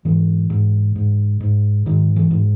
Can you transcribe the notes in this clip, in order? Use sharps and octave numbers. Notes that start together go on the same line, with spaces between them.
G#2 E3
G#2
G#2
G#2
G#2 D#3
E3
G#2